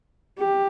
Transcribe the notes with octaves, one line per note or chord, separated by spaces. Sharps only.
G4